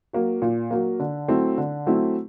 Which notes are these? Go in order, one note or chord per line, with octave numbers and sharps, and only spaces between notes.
F#3 A#3
A#2
F#3 A#3
D3
F#3 A3 C4 E4
D3
F#3 A3 C4 E4